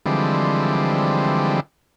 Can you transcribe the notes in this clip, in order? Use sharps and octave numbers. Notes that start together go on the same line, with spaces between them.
D3 E3 F3 G3 G#3 C4